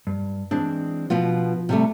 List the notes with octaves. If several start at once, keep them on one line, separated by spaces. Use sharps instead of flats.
G2
E3 G#3 C4 D4
B2 F3 B3 F4
C3 G3 A3